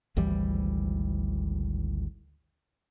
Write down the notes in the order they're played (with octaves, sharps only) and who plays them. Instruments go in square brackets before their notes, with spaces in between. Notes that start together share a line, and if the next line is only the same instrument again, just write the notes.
[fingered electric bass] G#1 D2 E3 G3